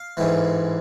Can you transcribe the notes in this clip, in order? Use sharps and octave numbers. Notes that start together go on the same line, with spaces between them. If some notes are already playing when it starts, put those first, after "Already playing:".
Already playing: F5
A1 G#2 E3